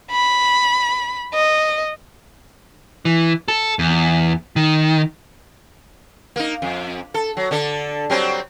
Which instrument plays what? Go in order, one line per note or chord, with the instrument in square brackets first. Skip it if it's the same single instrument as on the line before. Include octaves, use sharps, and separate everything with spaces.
[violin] B5
D#5
[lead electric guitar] E3
A4
E2
D#3
[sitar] A#3 D#4
F2
A4
F#3
D3 D4 A4
F#3 G3 C4